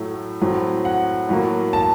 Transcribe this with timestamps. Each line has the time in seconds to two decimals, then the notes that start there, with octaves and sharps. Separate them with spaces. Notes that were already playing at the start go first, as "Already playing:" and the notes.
Already playing: A2 F#3 A3
0.41 A2 F#3 C4
0.85 F#5
1.29 A2 F#3 A#3
1.73 A5